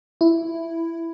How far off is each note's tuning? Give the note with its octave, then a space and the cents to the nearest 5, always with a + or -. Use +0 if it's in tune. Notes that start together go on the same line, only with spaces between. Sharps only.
E4 +5